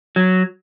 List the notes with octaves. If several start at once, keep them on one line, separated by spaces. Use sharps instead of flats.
F#3